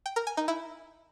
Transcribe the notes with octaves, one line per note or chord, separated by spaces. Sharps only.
G5
A#4
G#5
D#4
E4